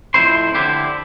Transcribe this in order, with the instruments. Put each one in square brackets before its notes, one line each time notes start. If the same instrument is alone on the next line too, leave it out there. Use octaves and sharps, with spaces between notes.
[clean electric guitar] F2 A2 E4 C5 C6
D3 E4 G4 C5